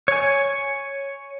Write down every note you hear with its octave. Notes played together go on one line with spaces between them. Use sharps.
C#5 G#5